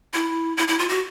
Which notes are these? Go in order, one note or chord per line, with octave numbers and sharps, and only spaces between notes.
E4
E4
E4
F4
F#4